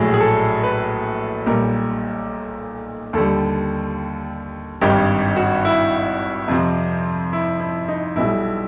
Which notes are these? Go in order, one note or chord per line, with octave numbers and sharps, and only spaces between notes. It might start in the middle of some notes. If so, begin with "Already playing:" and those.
Already playing: A#1 A2 F#3 G#4
G#4
A4
B4
B1 A#2 G3 A#4
D#2 D3 G3 A4
G#1 G2 D#3 G4
F#4
E4
F2 C3 F3
E4
E4
D#4
B1 B2 G3 E4